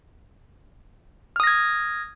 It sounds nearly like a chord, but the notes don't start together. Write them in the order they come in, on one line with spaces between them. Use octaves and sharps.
F6 D#6 A#6 G#6